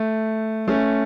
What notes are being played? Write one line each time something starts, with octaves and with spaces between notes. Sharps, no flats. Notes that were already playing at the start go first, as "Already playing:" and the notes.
Already playing: A3
A3 C#4